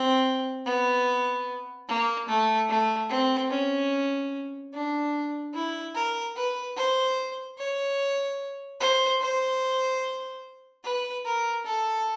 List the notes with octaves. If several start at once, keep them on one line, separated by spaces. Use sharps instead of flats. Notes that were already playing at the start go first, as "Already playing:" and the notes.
Already playing: C4
B3
A#3
A3
A3
C4
C#4
D4
E4
A#4
B4
C5
C#5
C5
C5
B4
A#4
A4